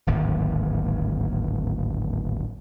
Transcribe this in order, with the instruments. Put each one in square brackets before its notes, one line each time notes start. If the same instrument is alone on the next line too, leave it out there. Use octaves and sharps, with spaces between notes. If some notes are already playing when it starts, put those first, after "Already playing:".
[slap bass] D1 G#1 D#2